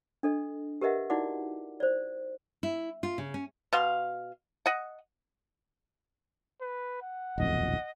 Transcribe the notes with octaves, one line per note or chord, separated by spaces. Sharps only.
D4 A4 D#5
G4 A#4 B4 D#5 E5 F#5
D#4 E4 F#4 D5 F#5 D6
C5 D5
E4
F4
C#3
C#4
B2 F5 C6
D#5 F#5
B4
F#5
D#1 B1 F2 D#5